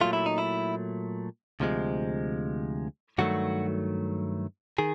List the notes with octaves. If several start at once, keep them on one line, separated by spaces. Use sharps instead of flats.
A#2 F#3 A3 F4
E4
D#4
E4
D2 C3 F3 G#3
G2 D#3 F#3 A3 F#4
D#3 G#4